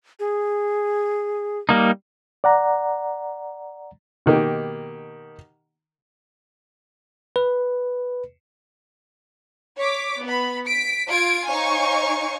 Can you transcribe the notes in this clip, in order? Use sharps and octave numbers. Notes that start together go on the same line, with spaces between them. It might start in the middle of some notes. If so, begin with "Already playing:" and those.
G#4
G3 A#3 D#4
D5 F#5 A#5
B2 D#3 A#3 G4
B4
C#5 D6 B6
B3 B5
B6 D7
F4 G#6 D7
D#4 C5 C#5 F5 G#5 C#6